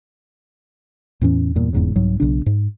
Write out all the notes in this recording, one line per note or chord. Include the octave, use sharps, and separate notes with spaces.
E2 A2 E3 C#4
E2 G2 A#2
F1 E2 G#2 C#3
C2 G#2 F#3
B1 C#3 D4
G#2